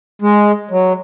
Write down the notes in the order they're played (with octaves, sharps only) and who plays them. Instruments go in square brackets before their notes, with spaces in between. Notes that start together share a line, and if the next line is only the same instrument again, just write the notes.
[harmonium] G#3
F#3